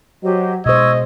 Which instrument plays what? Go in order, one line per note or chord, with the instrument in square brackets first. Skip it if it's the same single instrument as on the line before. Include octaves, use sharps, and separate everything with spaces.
[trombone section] F#3 [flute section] G4 C5 D#5
[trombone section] G#2 [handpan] B2 C5 [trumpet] D#5 [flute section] C#6 E6 G#6